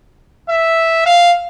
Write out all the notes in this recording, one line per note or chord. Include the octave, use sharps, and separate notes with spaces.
E5
F5